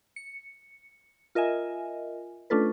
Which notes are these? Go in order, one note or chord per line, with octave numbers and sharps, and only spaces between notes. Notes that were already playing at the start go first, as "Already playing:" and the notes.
C#7
F4 A#4 D#5 E5 G#5
A3 C#4 D4 F4 A4 B4